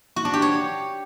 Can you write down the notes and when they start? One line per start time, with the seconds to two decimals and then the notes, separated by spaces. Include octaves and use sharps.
0.16 F#4
0.25 D4
0.34 G4
0.42 C#5